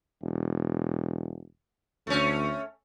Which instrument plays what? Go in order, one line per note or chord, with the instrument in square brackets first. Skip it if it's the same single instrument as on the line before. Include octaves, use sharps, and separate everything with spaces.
[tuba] E1
[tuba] D2 [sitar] A3 C#4